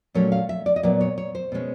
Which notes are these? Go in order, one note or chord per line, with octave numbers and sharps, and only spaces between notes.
A#2 F#3 A3 C#4 C#5
F5
E5
D5
D#5
A#2 F#3 B3 D5
C#5
C#5
C5
B2 G#3 C#4